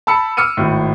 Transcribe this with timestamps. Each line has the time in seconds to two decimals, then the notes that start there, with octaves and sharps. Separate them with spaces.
0.07 A5 B5 E6 C#7
0.37 D6 E6 F6 C#7 D#7
0.57 G#1 A2